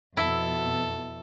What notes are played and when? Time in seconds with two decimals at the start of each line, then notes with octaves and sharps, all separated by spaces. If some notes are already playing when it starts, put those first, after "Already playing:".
0.17 F2 B2 E4 A4